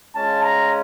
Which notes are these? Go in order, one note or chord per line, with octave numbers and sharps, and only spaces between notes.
G#3 C#4 F4 A5
A#5